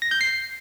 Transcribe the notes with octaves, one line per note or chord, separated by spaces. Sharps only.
A#6
G6
C7